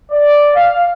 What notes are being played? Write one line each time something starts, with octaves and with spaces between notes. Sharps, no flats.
D5
F5